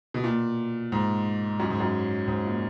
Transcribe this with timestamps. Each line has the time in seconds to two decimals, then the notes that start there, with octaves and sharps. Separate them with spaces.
0.14 B2
0.24 A#2
0.92 G#2
1.60 F#2
1.70 G#2
1.80 F#2
2.28 G#2
2.45 A#2